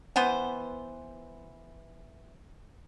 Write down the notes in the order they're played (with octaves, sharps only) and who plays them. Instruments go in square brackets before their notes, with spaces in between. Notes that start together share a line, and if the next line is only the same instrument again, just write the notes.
[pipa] E3 B3 C5